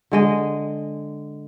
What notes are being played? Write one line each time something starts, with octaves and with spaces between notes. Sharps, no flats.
D3 G#3 D#5